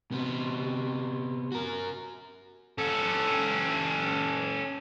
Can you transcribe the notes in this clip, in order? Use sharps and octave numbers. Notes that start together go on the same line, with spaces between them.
C3 B3
F#4 A#4
C#4 A4